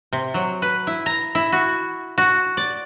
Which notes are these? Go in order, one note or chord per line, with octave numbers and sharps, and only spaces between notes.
C3
F#3
B4
E4
A#5
E4
F#4
F#4
D5